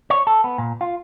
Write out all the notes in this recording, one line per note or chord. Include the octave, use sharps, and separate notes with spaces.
C#5
A4
B3
A#2
F4